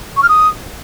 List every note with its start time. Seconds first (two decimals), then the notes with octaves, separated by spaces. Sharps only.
0.16 C#6
0.22 F6
0.28 D#6